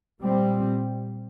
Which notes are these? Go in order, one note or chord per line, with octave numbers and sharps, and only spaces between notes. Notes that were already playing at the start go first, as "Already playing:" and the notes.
A#2 G3 C4